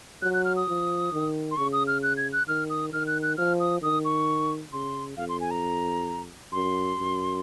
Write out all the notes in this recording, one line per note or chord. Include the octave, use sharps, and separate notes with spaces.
F#3 F#6
F#6
F6
D#6
F3
D#3
C6
C#3 C#6
D#6
F6
F#6
G#6
F#6
D#3 F6
D#6
D#3 F6
F#6
F#6
F3 F6
D#6
D#3 D#6
C#6
C#3 C6
F2 F5
C6
G#5
A#5
F#2 C6
F#2